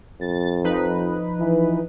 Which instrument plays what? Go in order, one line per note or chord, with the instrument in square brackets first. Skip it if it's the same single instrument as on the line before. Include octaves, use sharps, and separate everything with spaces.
[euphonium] F2 [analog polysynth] A6
[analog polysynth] F3 D#4 B4
[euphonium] E3